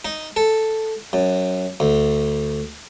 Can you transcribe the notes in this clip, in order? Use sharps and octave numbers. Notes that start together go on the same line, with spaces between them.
D#4
A4
F#2
D2